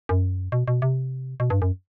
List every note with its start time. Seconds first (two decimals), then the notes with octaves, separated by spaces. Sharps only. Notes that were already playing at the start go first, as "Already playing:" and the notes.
0.09 F#2
0.52 B2
0.68 B2
0.82 C3
1.40 B2
1.50 G2
1.62 F#2